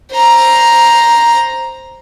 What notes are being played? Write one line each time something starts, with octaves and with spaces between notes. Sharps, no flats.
C5 A#5